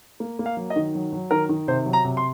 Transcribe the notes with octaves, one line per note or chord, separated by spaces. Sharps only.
A#3
A#3
F5
F#3
D#5
D#3
F#3
F#3
D#3 A#4
D#3
C3 C5
F#3
A#5
C3
C6